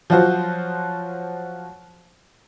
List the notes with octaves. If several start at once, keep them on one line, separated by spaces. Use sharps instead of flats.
F3 F#3 F4 F#4 C5